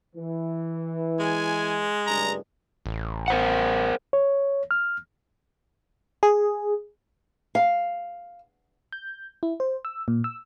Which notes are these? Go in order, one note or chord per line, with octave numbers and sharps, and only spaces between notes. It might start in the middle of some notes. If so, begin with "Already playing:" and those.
E3
G#3 G#5
F#1 G2 A#5
A1
A#4 C5 F#5
C#5
F6
G#4
F5
G6
E4
C5
E6
A#2
E6